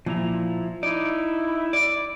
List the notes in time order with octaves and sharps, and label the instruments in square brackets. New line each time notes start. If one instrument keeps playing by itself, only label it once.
[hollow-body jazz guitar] A#2 [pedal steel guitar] F3 E4 A#5
[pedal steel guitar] D#4 [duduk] E4 [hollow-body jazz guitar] D5
[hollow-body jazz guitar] D5